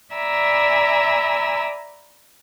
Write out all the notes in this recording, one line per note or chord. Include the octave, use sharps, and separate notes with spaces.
D5 E5 G#5 A#5 B5 E6